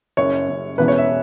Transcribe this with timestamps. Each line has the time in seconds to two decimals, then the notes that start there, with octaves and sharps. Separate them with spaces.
0.17 F#1 F#2 C#3 C#5
0.48 F#1 F#2 C#3
0.78 E1 E2 C#3 E3 B4
0.88 C#5
0.98 E5